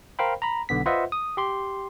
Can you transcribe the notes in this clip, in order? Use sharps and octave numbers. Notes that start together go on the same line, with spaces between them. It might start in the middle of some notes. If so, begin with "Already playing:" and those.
A#4 C5 F5 G5 B5
A#5 B5
B1 D3 B3 B6
F4 B4 C5 D#5 E5 F#5
D#6
G4 C6